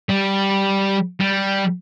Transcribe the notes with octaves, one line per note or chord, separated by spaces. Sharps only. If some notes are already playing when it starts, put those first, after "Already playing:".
G3
G3